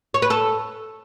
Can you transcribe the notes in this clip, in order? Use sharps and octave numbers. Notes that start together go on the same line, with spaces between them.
C#5
B4
A4